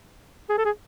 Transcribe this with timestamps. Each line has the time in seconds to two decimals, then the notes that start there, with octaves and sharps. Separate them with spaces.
0.50 G#4
0.58 A4
0.65 G#4